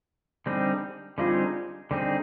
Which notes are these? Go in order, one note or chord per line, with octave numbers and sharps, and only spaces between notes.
D3 G3 C4 D#4 G#4
D3 G3 C4 D#4 F4 G#4
D3 G3 C4 D#4 G#4